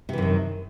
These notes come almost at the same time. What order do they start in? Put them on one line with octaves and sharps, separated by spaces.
C3 E3 F#2 D#3